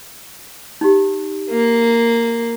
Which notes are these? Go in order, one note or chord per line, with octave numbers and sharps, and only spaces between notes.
D#4 G4
A#3